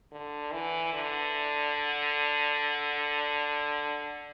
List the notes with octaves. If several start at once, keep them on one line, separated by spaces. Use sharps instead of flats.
D3
E3
D3